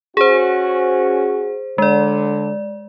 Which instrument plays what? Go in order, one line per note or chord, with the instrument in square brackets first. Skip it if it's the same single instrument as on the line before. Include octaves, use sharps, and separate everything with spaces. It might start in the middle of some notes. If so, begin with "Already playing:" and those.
[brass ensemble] C#4 F#4 [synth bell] G#4 C5
[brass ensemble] D3 [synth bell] G#3 D5